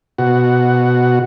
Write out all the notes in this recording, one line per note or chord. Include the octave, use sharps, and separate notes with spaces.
B2 F#4